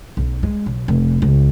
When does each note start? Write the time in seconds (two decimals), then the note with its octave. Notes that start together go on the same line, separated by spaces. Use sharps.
0.17 B1
0.43 G#3
0.66 B1
0.88 F1
1.22 C#2